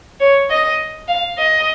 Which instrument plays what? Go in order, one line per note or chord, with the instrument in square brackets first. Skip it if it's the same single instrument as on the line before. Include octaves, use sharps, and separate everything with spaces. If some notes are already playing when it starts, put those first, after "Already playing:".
[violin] C#5
D#5
F5
D#5